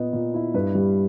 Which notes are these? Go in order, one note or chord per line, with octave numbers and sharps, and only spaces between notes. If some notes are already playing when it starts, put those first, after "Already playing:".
Already playing: A#2 B3 D#5
A#2
E4
G2 B4
G3